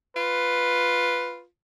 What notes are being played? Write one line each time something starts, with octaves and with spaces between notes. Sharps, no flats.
F4 B4